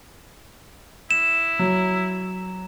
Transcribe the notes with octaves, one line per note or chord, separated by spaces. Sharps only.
E4 E7
F#3